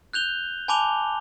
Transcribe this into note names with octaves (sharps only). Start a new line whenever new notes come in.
F#6 G6 F7 G7
G#5 A5 B5 D6 F7 G7